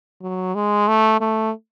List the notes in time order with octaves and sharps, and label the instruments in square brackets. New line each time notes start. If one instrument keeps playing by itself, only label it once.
[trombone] F#3
G#3
A3
A3